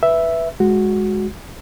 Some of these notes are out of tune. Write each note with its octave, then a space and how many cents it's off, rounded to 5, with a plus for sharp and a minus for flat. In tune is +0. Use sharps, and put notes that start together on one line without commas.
B4 +0 E5 +0
G#3 +0 F#4 +0